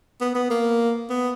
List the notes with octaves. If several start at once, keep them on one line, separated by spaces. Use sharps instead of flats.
B3
B3
A#3
B3